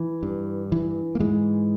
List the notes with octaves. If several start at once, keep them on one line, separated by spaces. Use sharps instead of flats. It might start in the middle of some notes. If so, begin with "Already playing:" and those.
Already playing: E3
G2
E3
A#3
G#2 E3 G#3